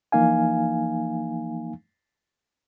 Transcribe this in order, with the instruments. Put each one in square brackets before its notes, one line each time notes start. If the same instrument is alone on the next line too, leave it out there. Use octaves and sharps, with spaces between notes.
[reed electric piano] E3 F3 A#3 D#4 F5 G#5